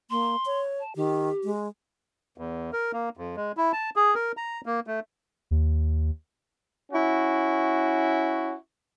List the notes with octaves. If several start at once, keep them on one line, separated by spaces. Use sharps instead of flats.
A#3 C6
C#5
A5
D#3 G4
G#3
E2
A#4
A#3
F2
G#3
E4
A5
G#4
A#4
A#5
A#3
A3
D#2
C#4 E4 F#4